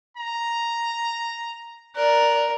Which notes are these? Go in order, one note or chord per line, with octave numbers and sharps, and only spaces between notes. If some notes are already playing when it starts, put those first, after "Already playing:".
A#5
A#4 D5 F#6